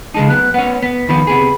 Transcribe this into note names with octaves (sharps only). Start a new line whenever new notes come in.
C#3 G#3 D#4 A5
F#2 B3 F#6
B3 C#4 F#5
B3 B6
D#3 F3 B3 B5
C3 B3 G#4